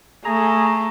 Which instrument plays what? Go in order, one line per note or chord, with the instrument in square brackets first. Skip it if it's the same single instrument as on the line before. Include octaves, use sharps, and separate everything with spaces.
[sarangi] A3 [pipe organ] G#4 A#5